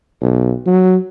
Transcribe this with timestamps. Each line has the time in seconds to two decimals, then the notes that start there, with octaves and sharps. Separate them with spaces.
0.21 B1
0.67 F#3